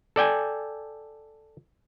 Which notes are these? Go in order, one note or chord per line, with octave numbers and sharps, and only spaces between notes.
A4 D5 G5 G#5